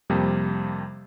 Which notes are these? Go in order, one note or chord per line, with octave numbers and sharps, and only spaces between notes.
F2 C3 G3 A#3